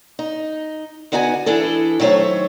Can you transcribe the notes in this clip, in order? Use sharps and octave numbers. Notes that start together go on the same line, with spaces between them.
D#4
D3 B3 D#4 F#4 F5 G#5
E3 D4 E4 G#4 A4
D#3 F#3 A3 C5 C#5